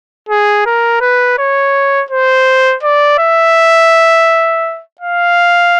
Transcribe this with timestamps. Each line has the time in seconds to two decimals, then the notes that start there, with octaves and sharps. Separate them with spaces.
0.29 G#4
0.66 A#4
1.01 B4
1.38 C#5
2.11 C5
2.83 D5
3.19 E5
5.01 F5